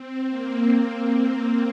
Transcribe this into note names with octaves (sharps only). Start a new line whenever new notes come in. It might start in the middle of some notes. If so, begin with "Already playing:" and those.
Already playing: C4
A#3